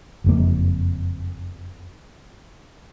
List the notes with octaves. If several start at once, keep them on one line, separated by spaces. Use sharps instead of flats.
F#1 F2 A#3